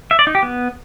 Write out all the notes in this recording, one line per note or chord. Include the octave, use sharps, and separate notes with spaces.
E5
D5
D#4
G4
B3